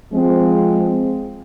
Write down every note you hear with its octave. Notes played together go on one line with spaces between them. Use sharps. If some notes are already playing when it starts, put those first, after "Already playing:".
F3 G#3 C4